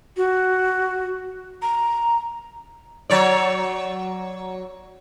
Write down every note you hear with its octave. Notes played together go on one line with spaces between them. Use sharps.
F#4
A#5
F#3 C#5 D5